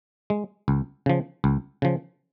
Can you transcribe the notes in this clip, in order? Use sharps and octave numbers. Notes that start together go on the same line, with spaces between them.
G#3
C#2
C#3 F3
C#2
C#3 F3